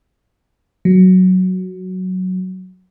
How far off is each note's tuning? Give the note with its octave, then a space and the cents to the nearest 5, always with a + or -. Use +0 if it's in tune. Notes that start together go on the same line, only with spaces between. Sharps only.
F#3 +0